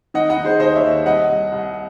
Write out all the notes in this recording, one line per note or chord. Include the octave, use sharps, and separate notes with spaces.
D#3 D#5 F#5
D#5 F#5
D#3
G#4 C5
D#2 C5 D#5
C#5 E5
D#2
C2 D#5 F#5
C2
C2